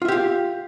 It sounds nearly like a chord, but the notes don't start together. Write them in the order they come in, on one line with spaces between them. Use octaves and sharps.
F4 E5 G4 F5